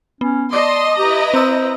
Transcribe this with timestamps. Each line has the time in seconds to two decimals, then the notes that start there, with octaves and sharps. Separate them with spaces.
0.21 B3 C#4
0.53 D5 D#5 A5 C6 D6
0.99 E4 G4 B4 A#5
1.34 C4 C5 E6